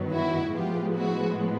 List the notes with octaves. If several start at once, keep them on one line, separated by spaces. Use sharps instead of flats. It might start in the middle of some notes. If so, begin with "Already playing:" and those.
Already playing: G2 D#3 F#3 B3
E4 F#4
A2 F3 G#3 B3 F4 G4
E4 F#4